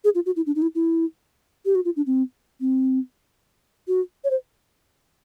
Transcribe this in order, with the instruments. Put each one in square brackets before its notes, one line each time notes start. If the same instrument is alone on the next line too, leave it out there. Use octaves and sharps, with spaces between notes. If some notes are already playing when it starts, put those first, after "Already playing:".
[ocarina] G#4
F4
F#4
E4
D4
D#4
E4
E4
G4
F#4
F4
D4
C4
C4
F#4
C#5
C5